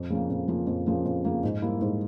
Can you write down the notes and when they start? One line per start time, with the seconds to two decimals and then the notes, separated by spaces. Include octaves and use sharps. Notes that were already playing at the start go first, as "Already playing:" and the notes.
Already playing: F2
0.10 C#3 F3 A#3
0.30 F2
0.48 C#3 F3 A#3
0.67 F2
0.86 C#3 F3 A#3
1.05 F2
1.25 C#3 F3 A#3
1.43 G#2
1.62 G3 A#3 E4
1.81 G#2